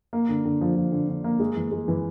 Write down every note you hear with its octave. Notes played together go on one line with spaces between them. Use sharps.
A#3
D3
D3
F3
F3
D3
D3
A#3
G#3
E3
G#3
E3